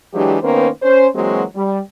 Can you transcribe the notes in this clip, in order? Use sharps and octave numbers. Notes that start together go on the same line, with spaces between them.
E3 F#3 G#3 D4 G4
D#3 A#3 B3 C#4 B4 C5
C#4 C5
E3 F#3 G#3 A#3 C4 F#4
G3